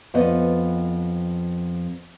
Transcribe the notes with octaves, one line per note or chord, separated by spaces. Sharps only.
F2 B3 D#5